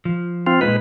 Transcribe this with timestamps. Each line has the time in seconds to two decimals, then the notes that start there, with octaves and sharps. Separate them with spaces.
0.05 F3
0.47 C4 F4
0.61 A#2 G#3 D#4 B4